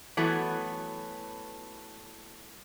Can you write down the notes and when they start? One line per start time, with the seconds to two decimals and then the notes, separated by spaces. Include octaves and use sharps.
0.17 E3 F#3 A3 B3